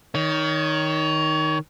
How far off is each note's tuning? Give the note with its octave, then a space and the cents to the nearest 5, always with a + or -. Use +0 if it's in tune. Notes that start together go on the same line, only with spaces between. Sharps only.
D#3 +5 C#5 +25